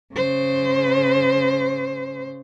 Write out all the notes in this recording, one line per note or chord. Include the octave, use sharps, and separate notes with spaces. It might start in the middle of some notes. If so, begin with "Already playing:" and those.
C#3 C5